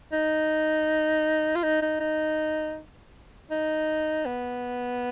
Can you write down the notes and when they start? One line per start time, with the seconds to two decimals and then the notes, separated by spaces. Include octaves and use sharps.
0.12 D#4
1.55 F4
1.63 D#4
1.82 D#4
2.00 D#4
3.51 D#4
4.26 B3